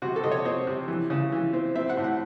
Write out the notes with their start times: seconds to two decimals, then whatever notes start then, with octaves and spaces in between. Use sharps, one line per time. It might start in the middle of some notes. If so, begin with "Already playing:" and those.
0.02 C3 F#4
0.16 A4
0.24 C3 D#5
0.31 C#5
0.45 C4 D#5
0.67 C3
0.88 E3
1.10 C#3
1.32 E3
1.53 C4
1.76 C4 E5
1.90 F#5
1.97 A2
2.04 F#5